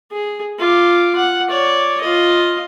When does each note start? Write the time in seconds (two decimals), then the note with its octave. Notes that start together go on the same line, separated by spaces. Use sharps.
0.12 G#4
0.59 F4 D6
1.16 F#5
1.49 C#5 D5
2.01 F4 D#5